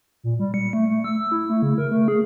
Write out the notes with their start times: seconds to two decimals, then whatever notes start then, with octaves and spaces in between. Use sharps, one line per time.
0.24 A#2
0.39 G3
0.54 C#7
0.73 A3
0.89 A3
1.04 E6
1.32 E4
1.50 A3
1.62 C#3
1.78 A#4
1.91 A3
2.08 G#4